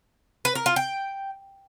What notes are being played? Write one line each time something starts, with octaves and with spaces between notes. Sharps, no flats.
B4
A#4
F4
G5